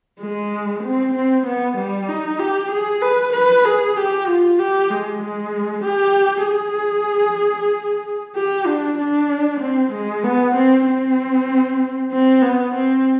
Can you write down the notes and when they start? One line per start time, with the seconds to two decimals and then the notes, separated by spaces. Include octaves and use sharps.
0.20 G#3
0.83 C4
1.14 C4
1.46 B3
1.77 G3
2.09 D#4
2.40 G4
2.71 G#4
3.02 B4
3.33 B4
3.65 G#4
3.97 G4
4.28 F4
4.59 G4
4.90 G#3
5.22 G#3
5.84 G4
6.47 G#4
8.36 G4
8.67 D4
8.98 D4
9.61 C4
9.92 G#3
10.23 B3
10.55 C4
10.86 C4
12.12 C4
12.42 B3
12.74 C4